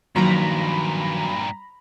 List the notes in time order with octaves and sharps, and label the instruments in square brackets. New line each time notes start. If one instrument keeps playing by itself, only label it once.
[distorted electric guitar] G2 A#2 [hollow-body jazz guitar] D#3 F3 A#3 [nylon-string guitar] F#3 [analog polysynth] A#5 B5